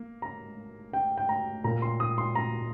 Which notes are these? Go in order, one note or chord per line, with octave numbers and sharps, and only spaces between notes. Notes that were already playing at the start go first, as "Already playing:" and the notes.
Already playing: A#3
A#5
G5
G5
A#5
A#2 A#3 A#5
C6
D#6
C6
A#5